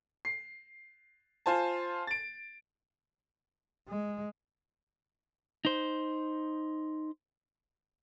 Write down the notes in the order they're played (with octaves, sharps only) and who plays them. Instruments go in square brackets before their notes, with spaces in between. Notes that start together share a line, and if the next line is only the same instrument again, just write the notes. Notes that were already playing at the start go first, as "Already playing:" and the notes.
[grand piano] C7
F4 C5 G#5 A5
A6 D7
[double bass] G#3
[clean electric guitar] D#4 C5